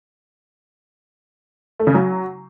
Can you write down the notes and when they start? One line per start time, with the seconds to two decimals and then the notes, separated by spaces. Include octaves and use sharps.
1.80 A3
1.87 C#3
1.94 F#3